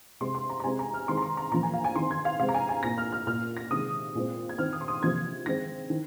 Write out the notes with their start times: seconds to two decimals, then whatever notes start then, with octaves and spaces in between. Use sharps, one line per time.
0.21 C3 G#3 C4 C6
0.35 C6
0.50 A#5
0.60 A#5
0.64 C3 G#3 C4 G#5
0.79 A#5
0.94 F6
1.08 D#3 G#3 C4 C6
1.17 A#5
1.22 C6
1.37 A#5
1.52 A#2 F3 A#3 A#5
1.63 G#5
1.74 F5
1.84 G#5
1.95 D#3 C4 C6
2.11 G#6
2.25 F5
2.39 C3 G#3 C4 F5
2.49 A#5
2.54 G#5
2.69 G#5
2.83 A#2 A#3 A#6
2.98 F6
3.12 F6
3.27 A#2 A#3 F6
3.57 A#6
3.71 C3 D#3 G#3 D#6
4.15 A#2 G#3 C4
4.49 G#6
4.58 D#3 C4 F6
4.73 D#6
4.81 C6
4.88 D#6
5.02 C3 F3 A#3 G#6
5.46 D#3 G#3 C4 A#6
5.90 D#3